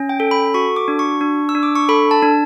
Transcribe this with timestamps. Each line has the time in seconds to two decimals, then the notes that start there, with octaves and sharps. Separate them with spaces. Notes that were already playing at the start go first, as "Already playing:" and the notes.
Already playing: C#4
0.09 G5
0.20 A4
0.31 B5
0.54 F#4 C#6
0.76 D6
0.88 D4
0.99 C#6
1.21 D4
1.49 E6
1.55 D4
1.63 D6
1.75 C#6
1.89 A4 B5
2.11 A5
2.23 D4